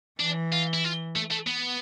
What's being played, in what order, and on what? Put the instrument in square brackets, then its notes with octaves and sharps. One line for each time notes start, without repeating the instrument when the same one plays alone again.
[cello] E3 [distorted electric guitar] D4
[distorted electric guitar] F4
E4
F4
A3
A3
B3